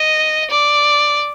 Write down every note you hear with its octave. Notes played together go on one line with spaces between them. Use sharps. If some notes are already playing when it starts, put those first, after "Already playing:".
Already playing: D#5
D5